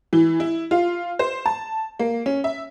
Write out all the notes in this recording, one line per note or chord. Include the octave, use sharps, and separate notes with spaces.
E3
E4
F4
C5
A5
A#3
C#4
E5